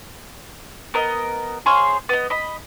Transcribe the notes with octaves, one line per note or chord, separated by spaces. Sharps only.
B3 A#4 D#5
G#4 C5 C#5 F5
B3 D#5
D#5 B5